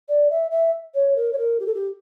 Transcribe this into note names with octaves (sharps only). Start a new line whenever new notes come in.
D5
E5
E5
C#5
A#4
C#5
A#4
G4
A4
G4